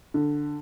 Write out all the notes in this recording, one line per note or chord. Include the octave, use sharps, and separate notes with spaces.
D3